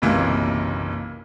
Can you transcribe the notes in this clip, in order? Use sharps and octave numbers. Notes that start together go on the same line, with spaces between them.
F#1 B1 C3 E3 A#3 G#6